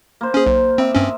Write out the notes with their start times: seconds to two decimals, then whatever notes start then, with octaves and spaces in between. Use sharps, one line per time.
0.21 A#3 C5
0.34 C#4 G#4
0.46 B1
0.78 C4 D#5 E5 D6
0.95 G2 C4 C#4